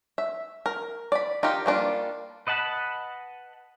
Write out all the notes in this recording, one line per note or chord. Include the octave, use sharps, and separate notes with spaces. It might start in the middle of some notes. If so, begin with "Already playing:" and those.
E5
A#4
D5 B5
D#4 F4 G4 A#4
G3 A#3 D4 F4
B4 D#5 F#5 A5 B5